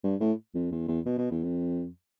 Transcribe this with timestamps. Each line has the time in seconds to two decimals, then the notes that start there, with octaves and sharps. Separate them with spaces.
0.04 G2
0.21 A2
0.55 F2
0.71 E2
0.88 E2
1.05 B2
1.18 B2
1.31 E2
1.43 F2